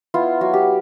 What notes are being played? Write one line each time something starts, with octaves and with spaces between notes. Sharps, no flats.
B3 E4 F4
F#3 F#4
G4